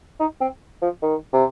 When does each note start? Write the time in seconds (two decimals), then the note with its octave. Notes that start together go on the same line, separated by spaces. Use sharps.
0.20 D#4
0.41 C4
0.82 F3
1.03 D#3
1.34 C3